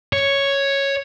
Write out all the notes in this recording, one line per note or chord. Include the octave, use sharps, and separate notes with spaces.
C#5